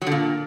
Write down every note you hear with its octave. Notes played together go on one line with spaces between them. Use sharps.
F#3
D3
A#2